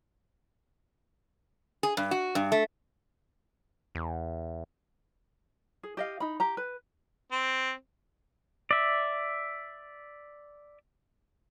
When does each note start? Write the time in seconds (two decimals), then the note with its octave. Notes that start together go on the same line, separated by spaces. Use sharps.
1.83 G#4
1.97 G2
2.11 F#4
2.35 G2
2.52 A3
3.95 E2
5.83 G#4
5.97 G4 D#5 F5
6.20 D#4 B5
6.40 G4 A#5
6.57 B4
7.32 C4
8.71 D5 E5